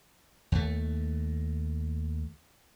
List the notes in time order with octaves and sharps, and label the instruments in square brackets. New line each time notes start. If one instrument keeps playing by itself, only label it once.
[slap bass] D#2 A3